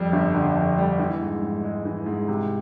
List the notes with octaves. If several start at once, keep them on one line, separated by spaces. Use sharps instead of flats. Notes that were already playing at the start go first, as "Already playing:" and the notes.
Already playing: F2 G3
G1
D3
F2
G3
E3
G#2
G#2
G#3
E3
G#2
C3